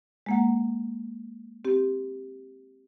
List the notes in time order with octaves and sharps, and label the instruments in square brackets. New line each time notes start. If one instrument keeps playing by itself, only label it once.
[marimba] G#3 A#3 F#5
C4 G4